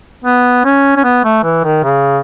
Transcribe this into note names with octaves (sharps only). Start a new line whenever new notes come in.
B3
C#4
C#4
B3
A3
E3
D#3
C#3